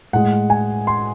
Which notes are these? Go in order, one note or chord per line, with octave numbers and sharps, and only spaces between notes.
A2 G#3 F#5
G#5
C6